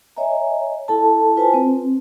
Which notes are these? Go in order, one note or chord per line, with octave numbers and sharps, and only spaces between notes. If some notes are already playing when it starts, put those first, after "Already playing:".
C#5 D#5 E5 G#5 A#5
E4 A4 A5
F4 B4 C5 G#5 A5
C4